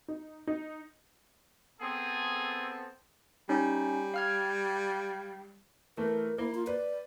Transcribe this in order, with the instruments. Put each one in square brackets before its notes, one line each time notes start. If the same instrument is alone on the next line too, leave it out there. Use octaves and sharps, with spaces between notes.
[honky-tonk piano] D#4
D#4
[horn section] B3 C4 A4 [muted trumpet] G#4
[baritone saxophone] G3 [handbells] C#4 D#4 C#5
[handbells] F5 F6 G#6
[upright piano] E3 A3 [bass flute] A#4
[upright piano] A#3 [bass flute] E4
[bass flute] F4
[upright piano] B4 [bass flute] D5